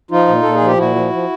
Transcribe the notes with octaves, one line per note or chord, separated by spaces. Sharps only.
F3 D#4 F4
A#2
A#2 A4
G#4
F3 G4
A#2 E4 F#4
F3
F3